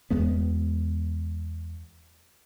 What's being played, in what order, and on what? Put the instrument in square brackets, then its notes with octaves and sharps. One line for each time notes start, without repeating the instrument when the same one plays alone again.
[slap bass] E2 G#3 B3